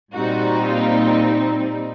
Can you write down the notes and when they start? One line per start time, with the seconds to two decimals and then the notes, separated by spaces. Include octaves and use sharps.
0.13 A#2 G3 C4 D#4 F#4
0.66 F4